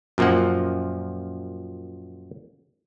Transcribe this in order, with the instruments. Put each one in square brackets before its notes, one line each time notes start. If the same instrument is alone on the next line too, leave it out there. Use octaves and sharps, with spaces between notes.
[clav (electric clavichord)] F#2 A#2 F3 A#3 F#5